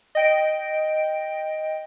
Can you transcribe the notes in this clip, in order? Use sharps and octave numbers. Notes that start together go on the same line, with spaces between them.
D#5 G5 D7